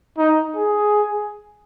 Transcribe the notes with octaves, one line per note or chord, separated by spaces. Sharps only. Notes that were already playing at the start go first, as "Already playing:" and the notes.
D#4
G#4